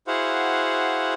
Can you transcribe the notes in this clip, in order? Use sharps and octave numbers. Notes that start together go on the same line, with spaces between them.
E4 F#4 G#4 C5 F5 F#5